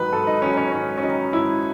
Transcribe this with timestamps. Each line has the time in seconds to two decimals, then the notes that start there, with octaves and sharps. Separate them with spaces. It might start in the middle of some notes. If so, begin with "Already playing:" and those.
Already playing: G#2 D#3 F#3 B4
0.13 G#2 A4
0.27 D#4
0.42 D#3 F#3 C#4
0.57 C#4
0.72 G#2 C#4
0.98 C#4
1.02 D#3 F#3 D#4
1.33 G#2 E4